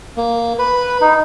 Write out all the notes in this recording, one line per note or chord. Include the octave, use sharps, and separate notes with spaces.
A#3
B4
D#4